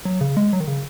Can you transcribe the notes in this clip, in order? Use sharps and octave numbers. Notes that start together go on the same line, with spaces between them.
F#3
C#3
G#3
F#3
D#3
C#3